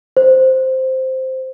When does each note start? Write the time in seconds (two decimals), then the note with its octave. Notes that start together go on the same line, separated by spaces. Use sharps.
0.17 C5